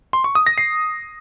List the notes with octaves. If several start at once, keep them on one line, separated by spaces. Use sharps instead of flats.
C6
C#6
D#6
A#6
C7